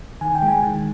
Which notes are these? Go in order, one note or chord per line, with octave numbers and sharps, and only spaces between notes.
D#3 G#5
G5
G#3
G#5
D#3